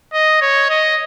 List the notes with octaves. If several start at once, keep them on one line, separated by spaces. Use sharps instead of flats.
D#5
C#5
D#5